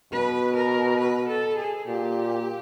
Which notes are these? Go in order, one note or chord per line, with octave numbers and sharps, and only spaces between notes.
B2 B4
A#4
B4
A4
G#4
A#2 G4